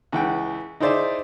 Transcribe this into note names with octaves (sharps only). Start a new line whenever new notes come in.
C#2 E3 F#5 G5
D#4 E4 G#4 C5 D5 E5